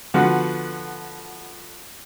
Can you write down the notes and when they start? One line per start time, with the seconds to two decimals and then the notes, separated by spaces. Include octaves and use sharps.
0.14 D3 F3 B3 F#4